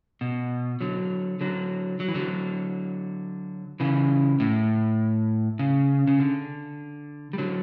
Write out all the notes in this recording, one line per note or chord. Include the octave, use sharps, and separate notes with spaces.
B2
D3 F#3
D3 F#3
F#3
E3
D3 F#3
C#3 E3
A2
C#3
C#3
D3
G3
D3 F#3